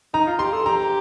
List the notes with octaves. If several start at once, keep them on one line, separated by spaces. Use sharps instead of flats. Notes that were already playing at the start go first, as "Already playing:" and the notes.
D#4 A#5
F4
G4 C6
A4
G4 A#5